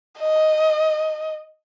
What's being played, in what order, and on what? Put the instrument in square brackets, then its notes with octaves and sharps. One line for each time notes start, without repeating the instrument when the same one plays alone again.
[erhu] D#5